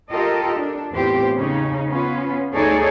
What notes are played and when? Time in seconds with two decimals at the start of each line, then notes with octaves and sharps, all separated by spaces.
0.11 F4 G4 A4 A#4 D#5
0.59 D4
0.93 E2 A2 C4 F4 G4 C5
1.37 C#3 C#4 D#4
1.89 B3 C#4 F4 B4
2.54 D2 D#4 G#4 A4 C#5 D5